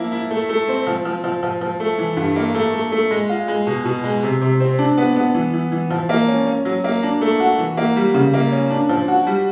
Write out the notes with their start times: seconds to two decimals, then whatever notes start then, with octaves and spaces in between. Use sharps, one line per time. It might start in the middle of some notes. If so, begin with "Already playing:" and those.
Already playing: F3 A#3 E4
0.12 E4
0.31 A3
0.49 A3
0.68 C4
0.87 F3
1.05 F3
1.24 F3
1.43 F3
1.61 F3
1.80 A3
1.99 E3
2.17 G2
2.36 A#3
2.55 A3
2.73 A3
2.92 A3
3.11 G#3
3.29 F4
3.48 G#3
3.67 B2
3.85 B2
4.04 G#3
4.23 C3
4.41 C3
4.60 C4
4.79 D4
4.98 B3
5.16 B3
5.35 E3
5.54 E3
5.72 E3
5.91 F3
6.09 A#3
6.28 C#4
6.47 C#4
6.65 F#3
6.84 A#3
7.03 D4
7.21 A3
7.40 F#4
7.59 E3
7.77 A#3
7.96 G3
8.14 C#3
8.34 A#3
8.52 C#4
8.71 D4
8.89 F3
9.08 F#4
9.27 G3